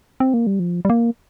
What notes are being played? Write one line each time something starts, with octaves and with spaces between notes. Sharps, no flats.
C4
A#3
G3
F3
G3
A#3